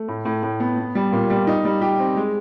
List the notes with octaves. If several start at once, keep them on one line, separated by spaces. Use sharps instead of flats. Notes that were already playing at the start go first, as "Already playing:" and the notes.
Already playing: A3
A2
A2
A2
B3
B3
G3
A#2
G3
D#4
G3
G4
C4
G#3